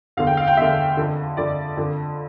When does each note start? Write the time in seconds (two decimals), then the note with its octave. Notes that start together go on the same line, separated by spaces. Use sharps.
0.17 E2 D3 F5
0.27 G5
0.37 F5
0.47 G5
0.57 E2 D3 E5
0.97 F2 D3
1.37 F2 D3 D5
1.77 F2 D3